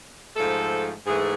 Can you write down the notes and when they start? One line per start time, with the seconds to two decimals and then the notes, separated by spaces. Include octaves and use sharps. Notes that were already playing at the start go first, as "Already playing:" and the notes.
0.37 G#2 F3 A3 A4
1.06 G#2 E3 A3 G#4